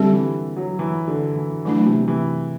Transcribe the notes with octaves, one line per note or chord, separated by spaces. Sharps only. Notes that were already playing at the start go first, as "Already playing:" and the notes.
Already playing: D3 G3 C4 G4
E3
F#3
E3
D3
E3
E3 F#3 A3 D4
C3
E3